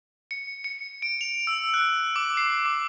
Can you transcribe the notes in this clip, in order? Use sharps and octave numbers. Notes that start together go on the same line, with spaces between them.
C#7
C#7
D7
F7
E6
F#6
D6
C7
D6